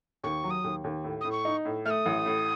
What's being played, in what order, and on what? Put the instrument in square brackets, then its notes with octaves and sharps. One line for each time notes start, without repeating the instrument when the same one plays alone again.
[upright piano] D#2 [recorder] C#6
[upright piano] F#3
[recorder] D#6
[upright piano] D#2
D#2
A2
[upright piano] A2 [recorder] D#6
[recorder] C#6
[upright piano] D#4
A2
[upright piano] A3 [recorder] D#6 F6
[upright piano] A1
A2